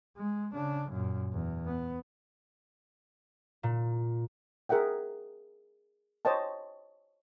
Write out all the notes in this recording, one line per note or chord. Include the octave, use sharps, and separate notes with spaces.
G#3
C#3 D4
F#2 A#2
E2
B3
A#2
G#4 A#4 E5 F#5 G5
C5 C#5 D#5 G5 A5